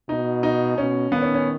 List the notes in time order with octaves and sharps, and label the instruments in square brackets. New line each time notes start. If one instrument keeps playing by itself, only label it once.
[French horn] B2 [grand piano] D#4
[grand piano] D#4
[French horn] B2 [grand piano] C#4
[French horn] D#3 [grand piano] B3
[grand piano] C#4
C#4